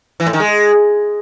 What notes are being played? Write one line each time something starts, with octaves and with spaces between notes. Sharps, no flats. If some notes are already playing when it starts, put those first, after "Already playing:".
E3
A2
D#3
G#3